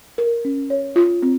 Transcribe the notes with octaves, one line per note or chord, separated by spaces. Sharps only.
A#4
C#4
C#5
F4
C4